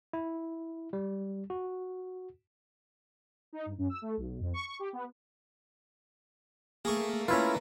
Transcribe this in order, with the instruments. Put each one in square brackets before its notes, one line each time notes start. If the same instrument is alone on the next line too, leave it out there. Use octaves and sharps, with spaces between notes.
[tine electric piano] E4
G3
F#4
[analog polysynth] D#4
G2
F#2
E6
A3
B1
F2
C#6
C#6
G4
B3
[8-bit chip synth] A3 A#3 [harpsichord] G#4 C#6
[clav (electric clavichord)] C#4 E4 F4 [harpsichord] B4 A#5